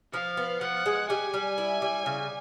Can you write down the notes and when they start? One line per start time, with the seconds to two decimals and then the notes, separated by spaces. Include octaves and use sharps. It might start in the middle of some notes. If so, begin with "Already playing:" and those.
0.13 F3 F5
0.37 B3
0.61 F3 F#5
0.86 G#3
1.09 G3 G#5
1.34 G3
1.58 E4
1.82 G3
2.06 C#3